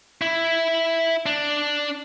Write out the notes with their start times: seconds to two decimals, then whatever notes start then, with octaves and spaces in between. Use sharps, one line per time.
0.22 E4
1.26 D4